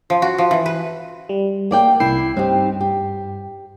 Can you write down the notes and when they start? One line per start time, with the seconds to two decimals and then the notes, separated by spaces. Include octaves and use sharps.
0.10 F3
0.22 F#4
0.38 F3
0.51 E3
0.66 B4
1.29 G3
1.71 A#3 D5 G5
2.00 C2 E4 G5 C7
2.37 G2 C4 D#4 G4
2.81 G4